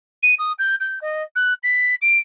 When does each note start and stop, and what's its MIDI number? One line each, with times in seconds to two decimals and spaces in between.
0.23 0.35 99
0.39 0.52 87
0.59 0.76 91
0.80 0.99 91
1.02 1.23 75
1.36 1.54 90
1.63 1.95 95
2.02 2.19 98